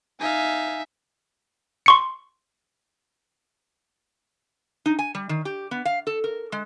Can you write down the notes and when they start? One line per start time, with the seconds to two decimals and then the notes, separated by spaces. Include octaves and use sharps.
0.20 D#4 E5 F5 G#5
1.86 C6 C#6 C#7
4.86 D#4
4.99 G#5
5.15 G3
5.29 D#3
5.45 G4
5.71 B3
5.85 F5
6.07 A4
6.24 A#4
6.52 G#3